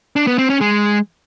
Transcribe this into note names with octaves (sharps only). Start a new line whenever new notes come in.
D4
B3
C4
C#4
G#3